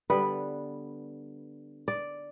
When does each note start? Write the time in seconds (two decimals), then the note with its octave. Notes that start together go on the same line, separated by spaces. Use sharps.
0.10 D3 G3 B3 B4
1.88 D5